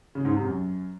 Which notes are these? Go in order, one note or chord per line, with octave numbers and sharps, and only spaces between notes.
C#3
G#2
C3
F#2